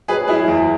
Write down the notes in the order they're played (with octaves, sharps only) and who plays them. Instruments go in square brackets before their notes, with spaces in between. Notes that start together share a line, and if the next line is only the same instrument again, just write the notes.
[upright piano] F#3 G#4 B4
F#3 E4 G#4
E2